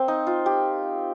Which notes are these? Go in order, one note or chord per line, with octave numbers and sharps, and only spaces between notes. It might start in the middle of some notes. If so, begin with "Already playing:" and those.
Already playing: A#3 C4
D#4
F4
G4